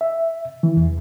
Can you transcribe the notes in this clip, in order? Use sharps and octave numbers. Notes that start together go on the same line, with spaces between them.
E5
E3
E2